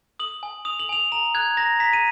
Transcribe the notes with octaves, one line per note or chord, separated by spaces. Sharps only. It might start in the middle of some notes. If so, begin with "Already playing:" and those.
D#6 F#7
G#5
D#6 F7
F#7
G#5 F7
A#5 F7
F#6 G#6
A#5 A#6
A#5 B6
D#7